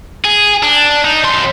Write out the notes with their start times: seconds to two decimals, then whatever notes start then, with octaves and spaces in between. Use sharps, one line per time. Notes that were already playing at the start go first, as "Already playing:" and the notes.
0.25 G#4
0.63 D4
1.05 D#4
1.24 F#2 C6